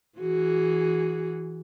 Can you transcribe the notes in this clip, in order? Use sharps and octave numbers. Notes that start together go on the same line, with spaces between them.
E3 F#4 G#4